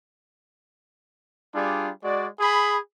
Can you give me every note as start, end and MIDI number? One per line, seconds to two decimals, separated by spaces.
1.55 1.90 55
1.55 1.90 62
1.55 1.90 65
1.55 1.90 68
2.03 2.26 56
2.03 2.26 66
2.03 2.26 74
2.40 2.77 68
2.40 2.77 83